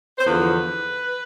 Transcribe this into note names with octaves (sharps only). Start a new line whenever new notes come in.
C5
E2 D3 F3 B4